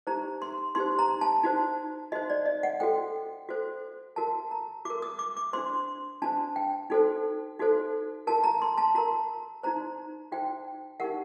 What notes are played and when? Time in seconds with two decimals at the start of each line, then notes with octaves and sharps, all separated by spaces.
0.07 D#4 G4 C5 A#5
0.42 C6
0.75 D#4 G4 C5 C6
0.99 A#5
1.21 A5
1.44 D#4 F#4 C5
2.12 D#4 F#4 C5 D#5
2.30 D5
2.46 D#5
2.63 F#5
2.80 F#4 A4 C5 G5
3.49 F#4 A4 C5
4.16 F#4 A#4 A5
4.51 A#5
4.85 F#4 D6
4.90 A#4
5.02 D#6
5.19 D6
5.37 D6
5.53 D4 F#4 C5 C6
6.22 D4 F#4 C5 A5
6.56 G5
6.90 D#4 F#4 A4 C5
7.59 D#4 F#4 A4 C5
8.27 F#4 A#4 A5
8.44 A#5
8.62 C6
8.78 A5
8.95 F#4 A#4 A#5
9.63 D#4 F#4 C5 A#5
10.32 D#4 F#4 C5 G5
11.00 D#4 G4 A#4 F#5